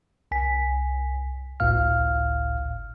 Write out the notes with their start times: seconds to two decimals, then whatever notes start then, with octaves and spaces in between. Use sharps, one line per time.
0.31 C2 G#5 B6
1.60 G1 C#2 A2 F5 F6